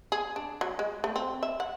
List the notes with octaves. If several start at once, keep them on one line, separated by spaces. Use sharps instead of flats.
G#4
D4
F#3
G#3
A3
C4
E5
F#5